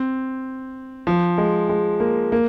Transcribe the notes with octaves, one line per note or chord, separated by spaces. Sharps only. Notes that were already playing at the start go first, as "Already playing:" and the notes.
Already playing: C4
F3
G#3
G#3
A#3
A#3